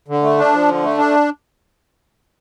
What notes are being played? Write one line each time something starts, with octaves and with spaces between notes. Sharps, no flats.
D3
A3
D4
F3
D3
A3
D4